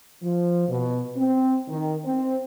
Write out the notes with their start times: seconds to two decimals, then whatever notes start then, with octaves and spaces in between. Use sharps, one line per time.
0.23 F3
0.68 B2
1.18 C4
1.69 D#3
2.05 C4